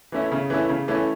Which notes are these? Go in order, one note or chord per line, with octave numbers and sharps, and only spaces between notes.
E3 A3 C#4 E4
C#3
E3 A3 C#4 E4
C#3
E3 A3 C#4 E4